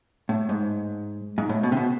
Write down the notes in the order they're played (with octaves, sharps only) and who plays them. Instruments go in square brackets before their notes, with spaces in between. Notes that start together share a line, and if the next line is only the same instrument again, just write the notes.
[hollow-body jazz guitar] A2
G#2
G#2
A2
B2
C3
B2